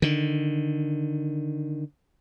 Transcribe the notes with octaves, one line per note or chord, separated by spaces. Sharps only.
D3 D#3